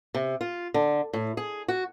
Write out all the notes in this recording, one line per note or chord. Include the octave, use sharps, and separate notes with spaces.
C3
F4
D3
A2
G#4
F#4